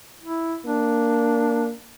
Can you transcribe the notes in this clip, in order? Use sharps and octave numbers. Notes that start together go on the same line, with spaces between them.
E4
A#3 D4